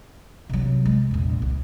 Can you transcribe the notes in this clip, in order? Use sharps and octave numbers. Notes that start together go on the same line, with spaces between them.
C3 F#3
G#3
A#1 E2
C#2